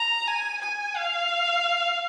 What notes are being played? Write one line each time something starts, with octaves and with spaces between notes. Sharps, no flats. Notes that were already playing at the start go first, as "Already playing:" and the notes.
Already playing: A#5
G#5
G#5
F5